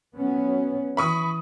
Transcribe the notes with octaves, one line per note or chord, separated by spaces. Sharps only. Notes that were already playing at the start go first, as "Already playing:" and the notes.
F#3 B3 C#4
E3 B5 C#6 D#6